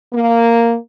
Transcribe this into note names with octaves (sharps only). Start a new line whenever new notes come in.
A#3